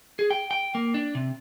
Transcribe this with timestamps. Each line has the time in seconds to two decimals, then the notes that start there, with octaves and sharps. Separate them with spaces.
0.19 G#4
0.31 G5
0.51 G5
0.75 A#3
0.94 D4
1.15 C3